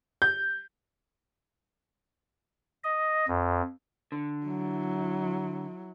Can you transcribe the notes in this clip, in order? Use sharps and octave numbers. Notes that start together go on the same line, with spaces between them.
G6
D#5
F2
D3
F#3 E4